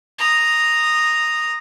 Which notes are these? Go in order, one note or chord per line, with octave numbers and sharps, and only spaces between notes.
A#5 D#6